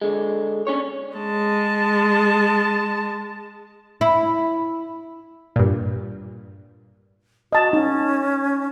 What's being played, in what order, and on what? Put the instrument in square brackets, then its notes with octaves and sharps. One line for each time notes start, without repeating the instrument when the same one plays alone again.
[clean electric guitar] D3 G#3
C#4 D4 C#5
[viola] G#3 A5
[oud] E4
[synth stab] G2 A#2
[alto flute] F#4 [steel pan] D#5 A5
[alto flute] C#4 [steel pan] D#4